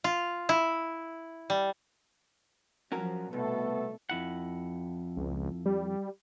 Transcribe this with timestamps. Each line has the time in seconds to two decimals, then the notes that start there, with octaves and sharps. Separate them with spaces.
0.04 F4
0.49 E4
1.50 G3
2.92 F3 F#3 C#4 F#4 A#4
3.33 C2 B2 A3 B3 A4
4.09 F2 E4 F#5
5.17 C#2
5.66 G3